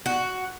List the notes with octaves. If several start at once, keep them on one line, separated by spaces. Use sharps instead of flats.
F#4